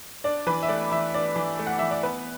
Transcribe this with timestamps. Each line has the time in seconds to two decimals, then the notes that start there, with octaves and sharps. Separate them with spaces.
0.24 D4 D5
0.47 E3 B4
0.63 E5
0.68 A3 D5
0.91 E3 E5
1.14 D4 D5
1.36 E3
1.59 A3
1.67 F#5
1.79 E3 E5
1.91 D5
2.03 B3 B4